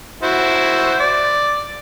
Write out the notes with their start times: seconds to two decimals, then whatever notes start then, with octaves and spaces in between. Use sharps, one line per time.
0.23 E4 F#4 C5
1.00 D5